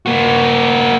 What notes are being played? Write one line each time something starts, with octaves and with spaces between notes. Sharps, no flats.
A#3 F#4